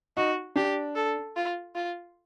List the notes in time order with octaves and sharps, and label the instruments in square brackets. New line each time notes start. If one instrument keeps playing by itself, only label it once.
[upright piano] D#4 [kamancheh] F#4
[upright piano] D4 [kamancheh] G4
[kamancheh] A4
F4
F4